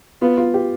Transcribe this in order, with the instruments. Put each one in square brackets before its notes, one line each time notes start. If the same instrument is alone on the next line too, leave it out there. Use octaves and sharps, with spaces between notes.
[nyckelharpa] B3 [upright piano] F4
[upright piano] F4
G4